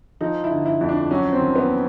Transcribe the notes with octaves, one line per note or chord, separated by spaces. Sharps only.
F3 D#4
E4
D3
E4
F2
D4
F#3 C#4
C4
D#3
B3